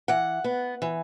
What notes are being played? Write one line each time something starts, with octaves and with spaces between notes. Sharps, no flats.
E3 F#5
B3
E3